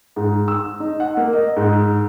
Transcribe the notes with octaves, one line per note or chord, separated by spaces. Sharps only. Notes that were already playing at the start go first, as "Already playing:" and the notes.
G#2
E6
D#4
F#5
A#3
D#5
G#2